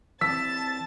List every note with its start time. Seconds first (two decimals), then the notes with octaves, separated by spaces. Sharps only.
0.21 E3 C4 A5 E6 A6 B6